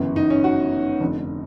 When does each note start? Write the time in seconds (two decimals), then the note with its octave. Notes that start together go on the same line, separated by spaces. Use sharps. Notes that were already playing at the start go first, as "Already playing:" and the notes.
Already playing: G1 F#2 C#3 E3
0.16 D#4
0.30 C#4
0.44 F#4
1.00 F1 F2 D3